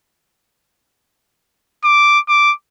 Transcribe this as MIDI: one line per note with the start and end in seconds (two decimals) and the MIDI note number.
1.84 2.19 86
2.28 2.52 86